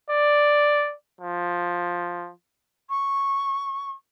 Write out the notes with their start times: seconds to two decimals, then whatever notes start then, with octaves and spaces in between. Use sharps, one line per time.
0.11 D5
1.21 F3
2.89 C#6